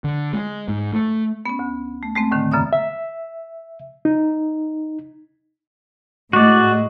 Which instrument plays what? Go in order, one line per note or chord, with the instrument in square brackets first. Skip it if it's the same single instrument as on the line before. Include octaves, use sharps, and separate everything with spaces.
[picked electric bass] D3
G#3
G#2
A3
[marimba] B3 C#4
D2
A3
G#3 A3 C4
D#2 A2 D3 D#3
F#2 C#3 B3 D5 E5 D#6
[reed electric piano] E5
D#4
[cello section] A2 G#3 D#5 [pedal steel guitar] F#4 D5